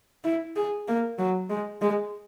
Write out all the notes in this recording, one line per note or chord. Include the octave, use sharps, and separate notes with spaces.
E4
G#4
A#3
F#3
G#3
G#3